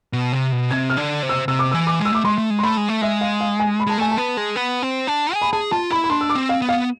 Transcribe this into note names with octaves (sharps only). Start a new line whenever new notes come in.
B2
C3
B2
C3 G#6
F6
D3
C3
E6
C3 E6
D6
E3 E6
D6
G#3
E6
A3 D6
G#3 C6
A3
G#3
C6
A3 B5
G#3
A3
G#3 E5
F5
F5
G#5
B5
G#3 A5
A3 G#5
A5
B3
G#3
B3
C4
D4
G#4
B5
G#4 A5
F4 A5
E4 B5
B5
D4 C6
E6
D6
C4
F5
B3
F5